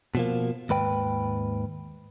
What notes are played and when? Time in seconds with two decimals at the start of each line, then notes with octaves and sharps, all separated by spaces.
0.15 B2 F3 A#3
0.69 D#2 G#2 B4 G5